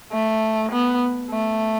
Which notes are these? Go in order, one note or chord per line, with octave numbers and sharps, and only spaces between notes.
A3
B3
A3